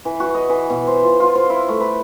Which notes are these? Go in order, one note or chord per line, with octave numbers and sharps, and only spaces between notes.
E3
F#4
D#5
E3
B2
C5
F4
F4
C5
E4
A3
B4